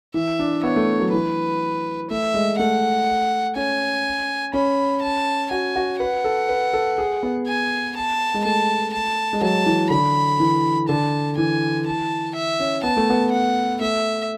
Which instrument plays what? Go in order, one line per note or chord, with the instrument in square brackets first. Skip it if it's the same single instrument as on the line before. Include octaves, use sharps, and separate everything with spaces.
[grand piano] E3 [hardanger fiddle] E5
[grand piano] D4
[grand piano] B3 [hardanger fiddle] C#5
[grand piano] A3
F#3
[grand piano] E3 [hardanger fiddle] B4
[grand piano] A3 [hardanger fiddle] E5
[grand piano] G#3
[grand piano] A3 [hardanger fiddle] F#5
[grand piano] C#4 [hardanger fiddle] G#5
[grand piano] C#4 [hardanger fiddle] B5
[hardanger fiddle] A5
[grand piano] F#4 [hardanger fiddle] G#5
[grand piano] F#4
[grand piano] B4 [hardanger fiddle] F#5
[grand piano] A4
B4
A4
G#4
B3
[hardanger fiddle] G#5
A5
[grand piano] G#3
[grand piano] A3 [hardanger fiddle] A5
[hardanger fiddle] A5
[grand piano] G#3
[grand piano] F#3 [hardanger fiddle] A5
[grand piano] E3
[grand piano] D3 [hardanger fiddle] B5
[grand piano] E3
[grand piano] D3 [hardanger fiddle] A5
[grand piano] E3 [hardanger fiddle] G#5
[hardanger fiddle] A5
E5
[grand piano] C#4
[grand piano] B3 [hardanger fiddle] A5
[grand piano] A3
B3
[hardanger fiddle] F#5
[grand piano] A3 [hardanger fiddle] E5